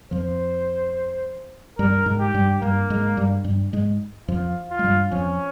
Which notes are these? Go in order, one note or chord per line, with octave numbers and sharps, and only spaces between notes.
F2 F3 C5
G2 G3 A#4
G#2 G#3
G4
G2 G3
G2 G3 A#3
G#2 G#3
G2 G3
G2 G3
G#2 G#3
F2 F3 F4
F4
G#3
G2 G3
F2 F3 C#4